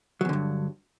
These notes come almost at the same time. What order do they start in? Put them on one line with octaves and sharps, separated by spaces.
F#3 E2 D3 G2